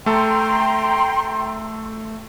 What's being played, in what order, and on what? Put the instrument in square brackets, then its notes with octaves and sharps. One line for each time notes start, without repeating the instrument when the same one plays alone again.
[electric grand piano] A3 A4 [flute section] G5 A#5 C6